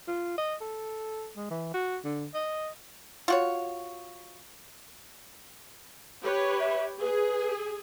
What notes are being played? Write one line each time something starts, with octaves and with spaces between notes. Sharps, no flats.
F4
D#5
A4
G#3
E3
F#4
D3
D#5
F4 F#4 C#5
G4 B4 C#5
E5
G#4 B4